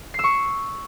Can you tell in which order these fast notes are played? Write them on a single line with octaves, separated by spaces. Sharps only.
C7 E6 C#6